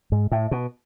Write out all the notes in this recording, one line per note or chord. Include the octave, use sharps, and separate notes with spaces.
G#2
A2
B2